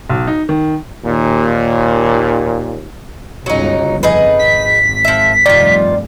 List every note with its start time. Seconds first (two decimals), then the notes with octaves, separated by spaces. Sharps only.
0.09 B1
0.27 D#4
0.49 D#3
1.04 D#2 A#2
3.46 G1 C#2 C#3 F#3 D#4
4.03 F2 D#4 G#4 B4
4.39 G#1 B6
5.05 F3 E5
5.46 F1 G2 D#3 F4 D5